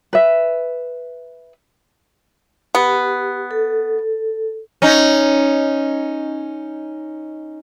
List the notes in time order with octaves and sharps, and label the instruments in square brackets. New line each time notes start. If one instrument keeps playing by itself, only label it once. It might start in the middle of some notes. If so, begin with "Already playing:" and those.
[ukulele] B4 E5
[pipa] B3 [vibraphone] G4
[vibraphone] A4
[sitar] C#4 D#4